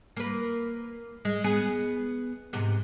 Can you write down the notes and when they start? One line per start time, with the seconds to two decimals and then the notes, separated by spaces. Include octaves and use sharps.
0.17 A#3 B4
1.25 G#3
1.44 B3 G#4
2.53 G#2 C3 B3